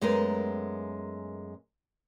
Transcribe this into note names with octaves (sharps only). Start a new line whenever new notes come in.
F#2 G#3 A3 B3 A#4